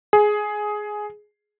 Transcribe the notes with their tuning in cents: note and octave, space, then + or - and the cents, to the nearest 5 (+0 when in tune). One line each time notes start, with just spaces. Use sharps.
G#4 +10